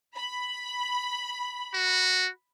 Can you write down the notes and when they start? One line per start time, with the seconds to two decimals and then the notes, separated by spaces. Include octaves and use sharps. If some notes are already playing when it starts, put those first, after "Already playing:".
0.14 B5
1.75 F#4